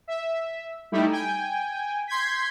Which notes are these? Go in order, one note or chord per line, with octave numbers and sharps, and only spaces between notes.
E5
G3 A3 D#4 E4 G4
G5 G#5
C6 G6 G#6 B6